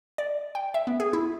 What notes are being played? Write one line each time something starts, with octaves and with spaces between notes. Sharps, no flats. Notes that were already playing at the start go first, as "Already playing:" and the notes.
D5
G5
E5
B3
G#4
E4